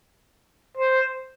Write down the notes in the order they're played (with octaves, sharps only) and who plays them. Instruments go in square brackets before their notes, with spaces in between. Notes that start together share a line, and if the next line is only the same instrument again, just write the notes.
[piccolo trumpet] C5